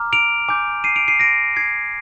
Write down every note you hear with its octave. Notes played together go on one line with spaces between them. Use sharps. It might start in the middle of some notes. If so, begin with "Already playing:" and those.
Already playing: A#5 D6 F6
D7 F7
G#5 D6 G6
C7 D#7
D7 F7
C7 D#7
C6 G6 A#6 D7
G#6 C7